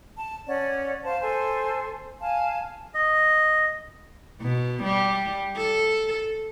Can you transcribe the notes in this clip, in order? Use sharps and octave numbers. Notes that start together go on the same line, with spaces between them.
A5
C#4 D5 F#5
C5 F5 A5
A4 C5 G#5
F5 G#5 A5
D#5
B2
G3
A4